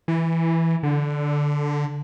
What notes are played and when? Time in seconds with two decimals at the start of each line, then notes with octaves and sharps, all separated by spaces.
0.08 E3
0.83 D3